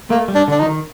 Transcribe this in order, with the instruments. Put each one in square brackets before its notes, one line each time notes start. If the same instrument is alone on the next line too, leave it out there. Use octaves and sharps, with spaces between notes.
[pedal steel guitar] A3 [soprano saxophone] A#3
[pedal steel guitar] G3
[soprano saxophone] D4
[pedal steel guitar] D3 [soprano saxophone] D4
[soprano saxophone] D#4
[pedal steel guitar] F3
D#3